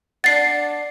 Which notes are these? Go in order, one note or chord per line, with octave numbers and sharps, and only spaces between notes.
D4 D5 F#5 A6 C7